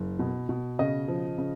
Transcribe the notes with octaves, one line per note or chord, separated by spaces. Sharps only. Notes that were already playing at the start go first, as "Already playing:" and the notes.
Already playing: F#1
B2
B2
C#3 D#5
F3
C#3